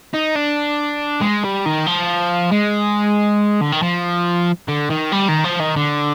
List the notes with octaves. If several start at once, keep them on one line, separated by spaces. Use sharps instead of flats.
D#4
D4
G#3
G3
D#3
F3
G#3
D3
D#3
F3
D3
D#3
G3
D#3
F3
D#3
D3